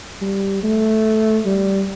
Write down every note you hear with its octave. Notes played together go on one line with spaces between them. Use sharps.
G3
A3
G3